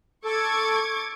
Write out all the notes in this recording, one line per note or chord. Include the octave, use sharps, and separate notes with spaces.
A4 C#6 D6 G#6